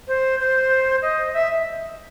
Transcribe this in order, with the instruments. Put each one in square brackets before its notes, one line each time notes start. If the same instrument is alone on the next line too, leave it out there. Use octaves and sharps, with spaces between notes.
[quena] C5
C5
D#5
E5